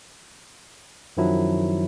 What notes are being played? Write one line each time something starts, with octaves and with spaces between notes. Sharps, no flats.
F#2 D#3 F3 F#3 E4